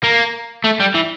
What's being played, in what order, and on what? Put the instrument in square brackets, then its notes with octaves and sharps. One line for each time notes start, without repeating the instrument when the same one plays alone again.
[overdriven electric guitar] A#3
A3
G3
E3